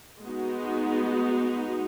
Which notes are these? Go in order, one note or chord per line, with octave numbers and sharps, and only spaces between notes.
G#3 B3 D#4 F#4